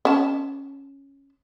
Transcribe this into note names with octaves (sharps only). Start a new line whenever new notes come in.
C#4 A5